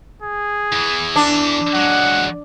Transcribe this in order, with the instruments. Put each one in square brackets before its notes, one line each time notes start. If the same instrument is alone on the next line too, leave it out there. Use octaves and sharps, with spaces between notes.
[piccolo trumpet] G#4
[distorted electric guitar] E2 E3
[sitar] D4
[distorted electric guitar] F#3 G#3 [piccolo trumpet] F#5